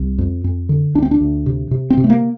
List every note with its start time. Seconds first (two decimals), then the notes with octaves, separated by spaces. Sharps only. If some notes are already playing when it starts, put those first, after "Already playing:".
Already playing: C2
0.18 F2
0.44 F2
0.69 D3
0.95 D2 D4
1.02 C4
1.11 D4
1.21 D2
1.46 C3
1.71 C3
1.90 C4
1.97 C3
2.04 A3
2.10 A#3